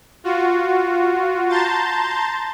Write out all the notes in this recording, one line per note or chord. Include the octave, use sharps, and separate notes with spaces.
F4 F#4
A5 A#5 C6 G6 A6